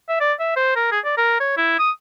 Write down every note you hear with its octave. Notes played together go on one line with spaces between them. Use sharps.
E5
D5
E5
C5
A#4
G#4
D5
A#4
C#5
E4
D#6